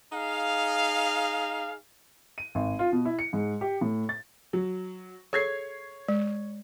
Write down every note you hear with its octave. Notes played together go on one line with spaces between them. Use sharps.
D#4 G#4 F5
D#7
G#1
F4
B2
E4
C#7
G#2
G4
A2
A6
F#3
G#4 A4 C#5 G#6 C7
G#3